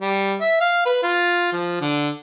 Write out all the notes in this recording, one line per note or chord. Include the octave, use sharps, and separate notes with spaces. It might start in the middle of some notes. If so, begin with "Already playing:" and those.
G3
E5
F5
B4
F4
F3
D3